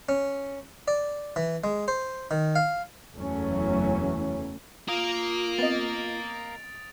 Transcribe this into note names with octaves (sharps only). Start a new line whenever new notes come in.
C#4
D5
E3
G#3
C5
D#3
F5
F#1 E2 E3 F#3 A3 C#4
F4 A#4 F5 D#6 D7 F7
B3 C4 D#5 A6